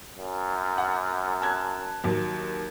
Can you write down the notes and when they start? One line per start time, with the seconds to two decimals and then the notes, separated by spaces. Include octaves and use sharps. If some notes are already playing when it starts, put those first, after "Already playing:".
0.18 F#2
0.78 F#5
1.42 A5 F#6 G#6
2.04 D#2 F#3